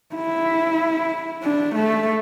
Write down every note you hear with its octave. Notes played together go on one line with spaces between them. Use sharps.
E4
D4
A3